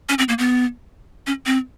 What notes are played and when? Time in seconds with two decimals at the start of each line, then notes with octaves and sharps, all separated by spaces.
0.09 C#4
0.18 C4
0.29 A#3
0.38 B3
1.27 C#4
1.46 C4